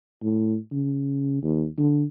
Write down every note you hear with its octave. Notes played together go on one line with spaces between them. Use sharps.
A2
C#3
D#2
D3